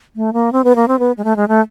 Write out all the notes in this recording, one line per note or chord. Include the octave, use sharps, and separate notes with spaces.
A3
A#3
C4
B3
A#3
C4
B3
G#3
A3
G#3
A3